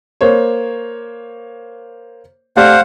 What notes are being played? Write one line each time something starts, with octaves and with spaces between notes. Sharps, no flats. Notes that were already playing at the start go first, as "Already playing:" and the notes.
A#3 C5 C#5
A3 G4 C5 D5 F5 F#5